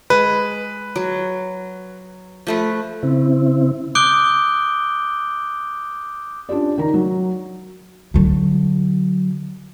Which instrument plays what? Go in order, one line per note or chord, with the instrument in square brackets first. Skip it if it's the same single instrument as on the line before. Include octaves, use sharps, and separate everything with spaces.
[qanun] G#3 [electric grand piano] B4
[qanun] F#3
F3 A3 B4
[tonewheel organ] C#3 C4 E4
[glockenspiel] D6 D#6 F#6 G6 D7 G7
[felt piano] C#4 D4 F4 G4 D5
D#3 A#5
F#3
[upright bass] D3 F#3